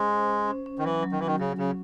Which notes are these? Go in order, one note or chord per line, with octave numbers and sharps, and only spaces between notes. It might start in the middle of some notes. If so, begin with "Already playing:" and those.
Already playing: G#3 C#4 C5
C5
C#4
C#4
C#4
D#3
E3 F#3
F#3
D#3
E3 F#4
D#3
C#3 F#3
C#3 C#4